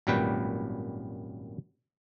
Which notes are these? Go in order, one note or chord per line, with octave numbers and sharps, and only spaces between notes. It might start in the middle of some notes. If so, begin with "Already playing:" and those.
G#1 F#2 A#2 G3 B4 G5